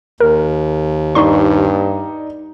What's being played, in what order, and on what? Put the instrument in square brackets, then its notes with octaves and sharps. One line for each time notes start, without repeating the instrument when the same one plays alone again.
[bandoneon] D#2 [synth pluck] A#4
[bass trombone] G2 [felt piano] D#4 D5 [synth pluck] C6 C#6